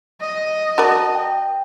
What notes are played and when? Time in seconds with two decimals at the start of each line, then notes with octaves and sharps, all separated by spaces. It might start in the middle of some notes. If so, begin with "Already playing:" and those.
0.21 D#5
0.78 F#4 A#4 D5 A5
1.15 G5